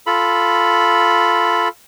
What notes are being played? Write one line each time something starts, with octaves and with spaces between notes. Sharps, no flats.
F4 A4 B5